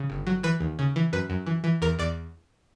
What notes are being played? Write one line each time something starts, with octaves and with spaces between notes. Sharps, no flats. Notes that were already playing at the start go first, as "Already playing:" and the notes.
Already playing: C#3
G1
F#3
E3 B4
D#2
C#3
E3
F#2 B4
F#2
E3
E3
E2 A#4
E2 D5